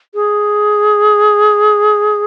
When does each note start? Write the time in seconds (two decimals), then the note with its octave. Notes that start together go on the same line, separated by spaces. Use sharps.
0.15 G#4